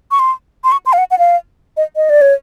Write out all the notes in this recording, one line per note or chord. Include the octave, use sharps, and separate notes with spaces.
C#6
C6
C6
C#6
C6
F5
F#5
F#5
F5
D#5
D#5
D5
C#5